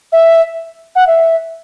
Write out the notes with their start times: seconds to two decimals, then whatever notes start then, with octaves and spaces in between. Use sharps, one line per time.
0.12 E5
0.95 F#5
1.07 E5